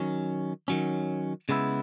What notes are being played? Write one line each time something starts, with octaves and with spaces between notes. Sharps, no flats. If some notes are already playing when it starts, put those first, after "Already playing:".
Already playing: D#3 F#3 C#4
D#3 F#3 C#4
C#3 G#3 B3 E4